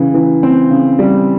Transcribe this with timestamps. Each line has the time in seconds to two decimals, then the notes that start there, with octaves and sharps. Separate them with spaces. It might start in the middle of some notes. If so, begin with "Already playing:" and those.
Already playing: C#3 E3
0.14 E3
0.43 C4
0.71 C#3
0.99 G3